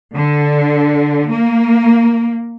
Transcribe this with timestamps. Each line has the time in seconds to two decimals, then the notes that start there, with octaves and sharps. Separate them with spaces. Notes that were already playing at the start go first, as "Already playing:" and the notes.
0.16 D3
1.31 A#3